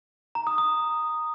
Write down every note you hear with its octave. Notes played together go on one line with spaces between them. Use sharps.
A#5
D#6
D#6